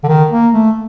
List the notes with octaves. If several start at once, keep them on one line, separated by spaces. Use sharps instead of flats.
D3
D#3
A#3
A3